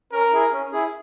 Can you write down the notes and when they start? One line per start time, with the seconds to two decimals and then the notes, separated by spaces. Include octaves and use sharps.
0.12 C#4 A#4
0.32 E4 G#4
0.53 C#4
0.72 E4 G#4